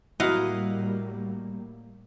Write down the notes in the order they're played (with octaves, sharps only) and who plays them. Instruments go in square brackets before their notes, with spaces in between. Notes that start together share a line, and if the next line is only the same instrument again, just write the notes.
[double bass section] A2 G3 A#3 [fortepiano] F#3 E4 [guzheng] D#5 F5 F#5